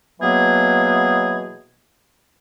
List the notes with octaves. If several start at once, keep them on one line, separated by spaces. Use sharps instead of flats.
B2 E3 F#3 A#3 B3 G#4